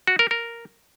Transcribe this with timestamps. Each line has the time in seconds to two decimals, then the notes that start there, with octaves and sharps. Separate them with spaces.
0.07 F#4
0.19 A#4
0.31 A#4